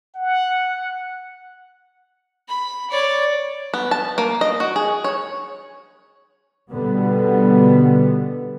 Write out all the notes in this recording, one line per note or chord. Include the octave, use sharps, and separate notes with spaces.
F#5
B5
C#5 D5
B3
A5
A#3
D#5
F#4
G#4
C#5
B2 D3 G3 B3